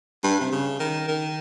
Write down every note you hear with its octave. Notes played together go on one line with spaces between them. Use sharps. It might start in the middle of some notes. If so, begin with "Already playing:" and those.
G2
C3
C#3
D#3
D#3